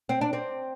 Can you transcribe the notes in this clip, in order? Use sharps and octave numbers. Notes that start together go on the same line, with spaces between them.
C4
D4
C4